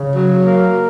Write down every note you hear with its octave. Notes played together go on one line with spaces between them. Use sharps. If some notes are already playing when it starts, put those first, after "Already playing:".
Already playing: C#3
F#3
A#3